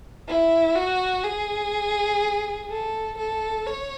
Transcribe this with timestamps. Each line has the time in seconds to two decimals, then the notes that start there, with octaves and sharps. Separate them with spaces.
0.28 E4
0.75 F#4
1.24 G#4
2.70 A4
3.18 A4
3.67 C#5